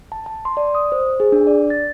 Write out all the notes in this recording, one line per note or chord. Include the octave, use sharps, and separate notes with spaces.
A5
A5
C6
D5
D#6
C5
G#4
D4
D5
A6